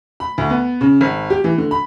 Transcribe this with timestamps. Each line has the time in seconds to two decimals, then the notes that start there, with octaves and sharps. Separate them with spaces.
0.20 B5
0.38 D2
0.50 B3
0.81 C#3
1.01 G#1
1.30 G4
1.44 E3
1.58 D3
1.71 B5